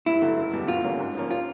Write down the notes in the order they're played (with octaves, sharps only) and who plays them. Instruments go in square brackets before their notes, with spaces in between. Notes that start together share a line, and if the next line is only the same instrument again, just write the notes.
[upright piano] G2 [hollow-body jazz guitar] E4
[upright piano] D3 F#3 A3
F#1
E2 B2 G3
[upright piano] D2 [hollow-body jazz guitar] F4
[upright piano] D3 G3 A#3 C#4
G#2
F3 A#3 C#4
[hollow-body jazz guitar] F4